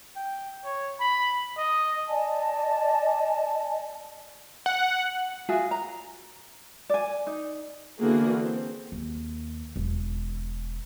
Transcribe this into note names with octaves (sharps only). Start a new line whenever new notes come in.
G5
C#5
B5
D#5
D5 D#5 G#5 A5
F#5
F4 F#4 G#4 E5
A#5
D5 G#5
D#4
D3 E3 A#3 B3 F#4 G#4
C4
D#2
E1